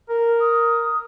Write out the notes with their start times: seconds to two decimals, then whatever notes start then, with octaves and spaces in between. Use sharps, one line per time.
0.09 A#4
0.40 D#6